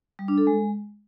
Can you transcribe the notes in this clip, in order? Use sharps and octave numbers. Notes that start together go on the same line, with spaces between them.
G3
D4
A4
G#3